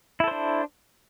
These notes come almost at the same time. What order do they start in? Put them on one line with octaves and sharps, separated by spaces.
E4 A4 C5 D4